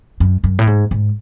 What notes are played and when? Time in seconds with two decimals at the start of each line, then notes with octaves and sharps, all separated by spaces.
0.20 F#2
0.44 F#2
0.59 A2
0.67 G#2
0.91 G#2